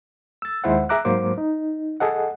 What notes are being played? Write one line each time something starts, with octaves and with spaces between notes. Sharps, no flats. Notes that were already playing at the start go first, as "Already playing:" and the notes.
E6 A6
D#2 G#3 E4 C5 F#5
G#4 E5 A#5 D6 F#6
G#2 F#3 A#3 C5 D6
D#4
G#4 A4 D#5 F#5